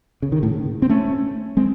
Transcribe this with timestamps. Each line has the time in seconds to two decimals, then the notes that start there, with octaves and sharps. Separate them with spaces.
0.22 C#3
0.32 D#3
0.42 A2 C#3
0.82 C4
0.89 A3 C#4
1.57 G#3 C4